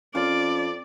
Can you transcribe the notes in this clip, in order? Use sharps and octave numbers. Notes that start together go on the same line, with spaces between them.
F2 C#4 F4 D5